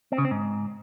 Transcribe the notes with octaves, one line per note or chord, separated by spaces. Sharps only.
C4
C#3
C4
G#2